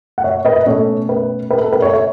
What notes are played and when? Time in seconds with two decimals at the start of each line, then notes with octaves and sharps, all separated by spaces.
0.18 F#5
0.24 C#5 E5
0.45 B4 D#5
0.56 D#5
0.66 B2 A3 C#4 A4 C#5
1.09 B4
1.51 B4
1.61 A4
1.73 B4
1.82 A4 C#5
1.93 C#5 E5